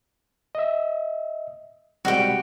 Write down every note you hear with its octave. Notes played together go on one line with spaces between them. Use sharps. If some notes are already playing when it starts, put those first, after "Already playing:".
D#5 E5
C3 G3 G#3 F#4 G4